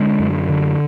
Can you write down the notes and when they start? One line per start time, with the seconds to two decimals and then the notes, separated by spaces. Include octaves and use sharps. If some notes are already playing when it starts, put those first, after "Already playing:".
Already playing: D3 G#3
0.20 F#2
0.49 D3